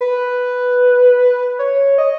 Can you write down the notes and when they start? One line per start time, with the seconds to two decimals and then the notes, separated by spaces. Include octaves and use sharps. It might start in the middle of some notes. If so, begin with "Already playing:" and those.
0.01 B4
1.59 C#5
1.98 D#5